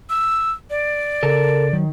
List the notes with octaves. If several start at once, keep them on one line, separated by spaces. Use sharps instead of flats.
E6
D5
C#3 A4 A#4 A5
D#3 F#3